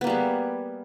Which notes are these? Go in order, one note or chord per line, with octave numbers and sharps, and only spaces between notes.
G3 A#3 B3 G#4